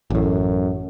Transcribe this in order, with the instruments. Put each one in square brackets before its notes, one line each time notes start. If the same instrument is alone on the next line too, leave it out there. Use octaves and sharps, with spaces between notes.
[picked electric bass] A1 A2 [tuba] F#2